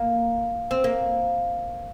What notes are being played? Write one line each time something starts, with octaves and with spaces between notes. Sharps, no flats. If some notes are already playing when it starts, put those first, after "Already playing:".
Already playing: A#3
C4
A#3